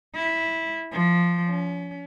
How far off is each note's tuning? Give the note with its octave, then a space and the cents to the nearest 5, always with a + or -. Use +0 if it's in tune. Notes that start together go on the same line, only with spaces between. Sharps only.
E4 -10
F3 -5
C#4 +35